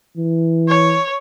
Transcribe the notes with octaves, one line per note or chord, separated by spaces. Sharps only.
E3
C#5